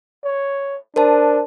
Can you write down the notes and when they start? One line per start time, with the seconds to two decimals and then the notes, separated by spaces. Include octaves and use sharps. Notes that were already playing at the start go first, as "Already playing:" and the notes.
0.24 C#5
0.96 D4 A#4 C5 A5